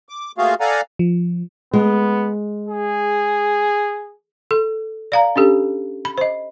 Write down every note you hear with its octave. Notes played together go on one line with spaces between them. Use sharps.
D6
A3 A#3 F4 F#4 G#4 F5
A4 D5 F5 F#5 G#5 A#5
F3
G#3 B3
G#4
A4
D5 F5 A#5
C#4 D4 G4 A4
B5
C5 D#5